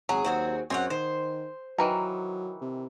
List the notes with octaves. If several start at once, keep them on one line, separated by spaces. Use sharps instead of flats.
G#1 F#3 G#4
D#2 C4 F#4 G#4
F#2 C4 C#4 G#4 F#5
D#3 C5
D#3 E3 F#3 A#5
C3